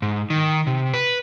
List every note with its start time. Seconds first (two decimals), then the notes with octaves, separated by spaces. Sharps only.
0.02 G#2
0.30 D#3
0.67 C3
0.94 B4